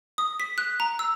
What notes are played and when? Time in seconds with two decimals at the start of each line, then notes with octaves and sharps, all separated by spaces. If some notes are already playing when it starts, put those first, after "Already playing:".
0.18 D#6
0.40 B6
0.58 F#6
0.80 A#5
0.99 E6